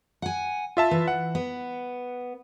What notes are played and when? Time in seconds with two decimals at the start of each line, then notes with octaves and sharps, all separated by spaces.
0.22 F#5 G#5
0.77 F4 E5 A5
0.91 E3
1.08 F#5
1.35 B3